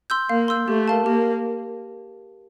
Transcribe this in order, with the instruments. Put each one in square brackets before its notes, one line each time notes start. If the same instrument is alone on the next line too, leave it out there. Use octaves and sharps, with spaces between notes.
[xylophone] C6 E6 G6
[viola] A#3 [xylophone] F5
[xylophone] C6 E6 G6
[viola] A3 [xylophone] G4
[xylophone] A#4 F5 A5
[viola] A#3 [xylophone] G4